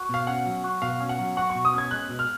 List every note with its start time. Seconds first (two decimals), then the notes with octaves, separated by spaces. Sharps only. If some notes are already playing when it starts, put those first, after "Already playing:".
Already playing: F#4
0.09 B2 F5
0.27 C#4 F#5
0.46 F#3
0.64 F#4
0.82 B2 F5
1.01 C#4
1.09 F#5
1.19 F#3
1.37 F#4 F#5
1.50 C#6
1.55 B2
1.65 D#6
1.73 C#4 G#6
1.91 G#3 F#6
2.09 B2
2.19 F6